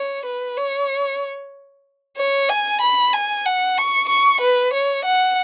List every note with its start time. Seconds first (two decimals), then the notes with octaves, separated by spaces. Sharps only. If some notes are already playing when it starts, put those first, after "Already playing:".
Already playing: C#5
0.25 B4
0.57 C#5
2.17 C#5
2.49 G#5
2.81 B5
3.13 G#5
3.45 F#5
3.78 C#6
4.09 C#6
4.41 B4
4.73 C#5
5.05 F#5